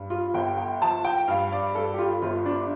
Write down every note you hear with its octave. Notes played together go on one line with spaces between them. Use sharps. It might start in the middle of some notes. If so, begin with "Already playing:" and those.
Already playing: G2
F4
G1 G5
G5
F3 A5
G5
G2 F5
D5
G2 A4
G4
F4
G1 F4
D4